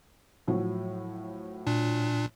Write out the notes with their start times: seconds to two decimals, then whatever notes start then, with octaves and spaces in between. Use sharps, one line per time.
0.48 A2 F3 F#3
1.67 A#2 D4